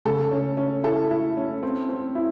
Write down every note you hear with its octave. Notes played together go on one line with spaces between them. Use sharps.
C#3 A4
C#4
C#4
E4 A4
E4
C#4
C4
C4
E4